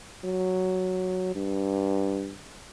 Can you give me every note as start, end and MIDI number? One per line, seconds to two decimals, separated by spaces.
0.25 1.31 54
1.35 2.35 43